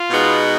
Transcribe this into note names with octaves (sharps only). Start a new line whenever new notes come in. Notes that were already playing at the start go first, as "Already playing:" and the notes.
Already playing: F4
B2 G#3 B3 D#4